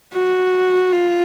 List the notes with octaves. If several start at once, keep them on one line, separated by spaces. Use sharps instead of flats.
F#4
F4